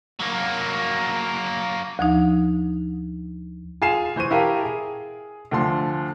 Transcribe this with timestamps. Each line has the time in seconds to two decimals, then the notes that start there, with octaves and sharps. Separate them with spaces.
0.20 F#3 A#3
1.99 D2 F3 D#4
3.82 F4 G#4 G#5 C7 E7
4.16 E3 C5 C#6 D#7
4.30 E4 G4 A#4 F5 G5 A5
4.63 G#4
5.51 D2 D3 F3 C6